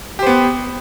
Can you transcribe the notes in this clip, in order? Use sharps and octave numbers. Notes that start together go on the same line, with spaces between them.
B3 G4 C5